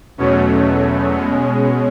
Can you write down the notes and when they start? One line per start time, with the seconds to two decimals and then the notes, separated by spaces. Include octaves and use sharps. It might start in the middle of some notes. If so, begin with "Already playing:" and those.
0.18 E2 B2 F#3 A3 C#4
1.13 B2 G#3